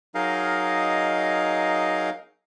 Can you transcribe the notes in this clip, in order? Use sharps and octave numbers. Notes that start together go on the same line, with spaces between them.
F#3 D#4 G#4 A#4 D#5 F5